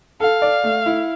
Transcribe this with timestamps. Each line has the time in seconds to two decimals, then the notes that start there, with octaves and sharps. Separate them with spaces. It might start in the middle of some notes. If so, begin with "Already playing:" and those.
0.20 A4 F5
0.42 D5
0.64 A3
0.86 E4